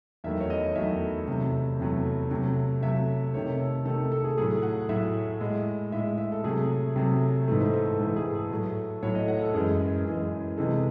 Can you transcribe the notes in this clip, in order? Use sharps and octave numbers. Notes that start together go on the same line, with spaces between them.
E2 D#3 F#3 A3 E5
C#5
D#5
E2 D#3 F#3 A3 E5
E2 C3 F#3 A3
E2 C3 F#3 A3
C3 F#3 A3
C3 F#3 A3 E5
C3 D#3 A3 C#5
A4
C3 D#3 A3 A4
A4
G#4
A2 F#3 A3 G#4
F#5
A2 F#3 A3 E5
A2 G#3
A2 G#3 E5
E5
A4
C3 F#3 A3 G#4
C3 F#3 A3
G#2 E3 A3 A4
C5
A4
A4
G#2 E3 A3 A4
G#4
A4
A2 F#3 A3
A2 F#3 A3 C#5
D#5
F#5
A4
F#2 E3 G#3 G#4
F#2 E3 G#3
C3 E3 G#3 A4